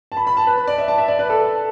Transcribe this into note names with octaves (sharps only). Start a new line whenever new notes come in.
A5
B5
B5
A5
B4
B4
D5
E5
A5
E5
D5
B4
A4